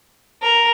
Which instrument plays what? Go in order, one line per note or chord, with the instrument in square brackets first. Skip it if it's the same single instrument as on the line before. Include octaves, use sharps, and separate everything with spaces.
[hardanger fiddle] A#4